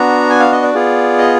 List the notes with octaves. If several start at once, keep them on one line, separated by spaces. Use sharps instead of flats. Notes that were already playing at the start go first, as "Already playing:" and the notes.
Already playing: B3 D4 F#4 A#5
G#5
F5
D#5
D5
B3 F4 G#4
D#5